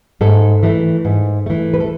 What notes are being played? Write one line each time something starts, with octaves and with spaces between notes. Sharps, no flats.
G#2 A4
E3 A3
G#2
E3 A3
B4
A4